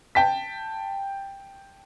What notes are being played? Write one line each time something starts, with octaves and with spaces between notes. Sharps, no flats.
G5 A5 B6